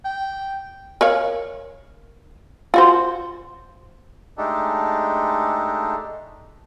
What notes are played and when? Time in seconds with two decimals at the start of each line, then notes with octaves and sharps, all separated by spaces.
0.05 G5
1.01 A#4 C#5 F5
2.74 F4 F#4 C5
4.38 G#3 A3 D4 D#4 G4 A4